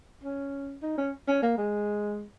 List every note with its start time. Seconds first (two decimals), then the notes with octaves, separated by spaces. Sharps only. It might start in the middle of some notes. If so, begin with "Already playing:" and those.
0.24 C#4
0.82 D#4
0.98 C#4
1.28 C#4
1.42 A#3
1.57 G#3